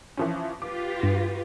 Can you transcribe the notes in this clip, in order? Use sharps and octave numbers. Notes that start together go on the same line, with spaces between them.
E3 F3 C#4
F4 G4 B4 D6
G2